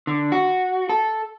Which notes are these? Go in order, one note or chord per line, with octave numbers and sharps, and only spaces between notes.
D3
F#4
A4